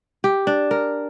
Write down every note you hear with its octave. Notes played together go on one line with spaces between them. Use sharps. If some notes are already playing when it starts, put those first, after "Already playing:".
G4
D4
A#4